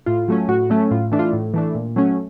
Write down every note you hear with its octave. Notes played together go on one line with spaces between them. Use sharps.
A2 F4
F#3 A3 C#4
A2 F#4
F#3 A3 C#4
A2 F4
E3 A3 D4
F4
A2
E3 A3 D4
A#2
F#3 A3 C#4